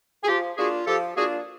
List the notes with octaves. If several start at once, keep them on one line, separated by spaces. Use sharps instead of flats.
G#4
F3 F4 G4
A#3 D4 F4 F#4 G#4
F3 G4 A4
A#3 D4 F4 F#4 G#4